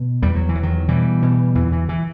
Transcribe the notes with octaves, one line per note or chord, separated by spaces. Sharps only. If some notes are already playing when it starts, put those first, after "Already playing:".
Already playing: B2
E2 G3
F#3
E3
E2
D#3 F#3
B2 E3 G3
B2
E2 E3
E3
E3